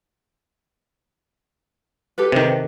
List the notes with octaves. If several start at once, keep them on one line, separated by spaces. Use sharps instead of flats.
G4 A4 B4
C3 D#3